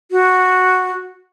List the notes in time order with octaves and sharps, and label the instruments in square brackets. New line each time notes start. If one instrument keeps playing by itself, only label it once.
[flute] F#4